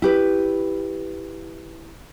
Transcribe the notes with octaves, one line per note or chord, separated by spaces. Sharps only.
E4 G4 B4